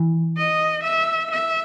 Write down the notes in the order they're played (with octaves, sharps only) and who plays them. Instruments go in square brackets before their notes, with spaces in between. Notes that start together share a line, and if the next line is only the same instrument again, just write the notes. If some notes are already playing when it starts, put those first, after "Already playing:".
Already playing: [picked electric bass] E3
[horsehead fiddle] D#5
E5
E5